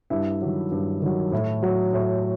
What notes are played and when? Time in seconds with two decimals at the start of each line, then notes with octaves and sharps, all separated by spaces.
0.10 G2 E4 E5
0.41 D#3 F#3
0.71 G2
1.02 D#3 F#3
1.32 A2
1.63 F#3
1.93 A2